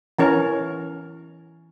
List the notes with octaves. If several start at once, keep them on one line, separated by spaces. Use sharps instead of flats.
E3 C#4 A#4